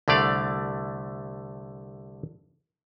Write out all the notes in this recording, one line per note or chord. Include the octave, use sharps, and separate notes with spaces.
C2 D3 A3 D5 F5